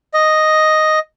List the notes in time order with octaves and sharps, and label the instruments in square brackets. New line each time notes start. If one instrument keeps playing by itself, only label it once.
[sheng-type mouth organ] D#5